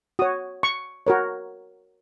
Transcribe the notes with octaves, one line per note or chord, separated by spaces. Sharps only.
F#4 C#5 D#6
C#6
F#4 A#4 C#5